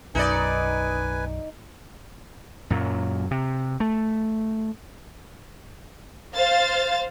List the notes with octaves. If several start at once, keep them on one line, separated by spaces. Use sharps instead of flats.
B1 F#2 D#4 B4 D5 G#5
F#2 A#2 F#3
C3
A3
C5 F5 A6